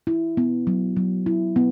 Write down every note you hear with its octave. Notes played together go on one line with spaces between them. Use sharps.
E4
B3
F#3
F#3
E4
B3